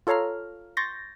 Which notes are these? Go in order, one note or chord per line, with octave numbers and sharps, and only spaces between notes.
F4 A4 C#5 F5 A#5 F6
C6 C#6 G6 A6 A#6